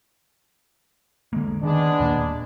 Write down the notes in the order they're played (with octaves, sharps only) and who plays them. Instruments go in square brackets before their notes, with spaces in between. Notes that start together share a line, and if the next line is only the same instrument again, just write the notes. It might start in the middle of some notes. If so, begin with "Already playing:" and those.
[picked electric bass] D3 G#3 A#3
[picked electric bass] D#3 [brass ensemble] G#3 B3 D4
[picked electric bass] D#1 A#2 A#3